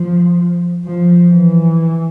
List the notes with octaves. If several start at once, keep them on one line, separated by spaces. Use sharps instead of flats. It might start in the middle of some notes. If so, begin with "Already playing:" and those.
Already playing: F3
F3
E3